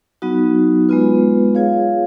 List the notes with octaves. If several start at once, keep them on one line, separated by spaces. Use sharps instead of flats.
F#3 B3 D#4 F#4
G#3 B3 F4 B4
F4 G#4 C#5 F5